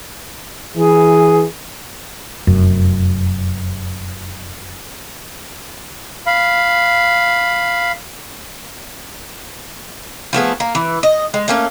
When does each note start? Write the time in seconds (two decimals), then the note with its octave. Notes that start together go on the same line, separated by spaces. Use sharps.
0.76 E3 G#4
2.47 F1 F#2
6.26 F5 B5
10.33 F3 A3 B3 G#4
10.60 A#3
10.75 E3
11.03 D#5
11.34 G#3
11.48 A3 A#3 C#4